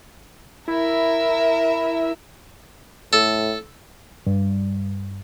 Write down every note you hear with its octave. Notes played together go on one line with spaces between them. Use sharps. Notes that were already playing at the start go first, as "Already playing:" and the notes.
E4 A#4 E5
A2 A4
G2